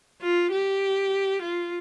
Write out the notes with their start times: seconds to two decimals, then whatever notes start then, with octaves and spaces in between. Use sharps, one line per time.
0.22 F4
0.52 G4
1.42 F4